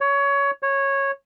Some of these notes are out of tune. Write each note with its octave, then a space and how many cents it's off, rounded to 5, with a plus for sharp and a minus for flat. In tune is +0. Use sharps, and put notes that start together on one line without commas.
C#5 +20
C#5 -10